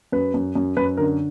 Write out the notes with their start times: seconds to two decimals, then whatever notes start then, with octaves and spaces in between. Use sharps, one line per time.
0.12 F#2 B4
0.34 F#2
0.55 F#2
0.77 F#2 B4
0.97 D3 A#4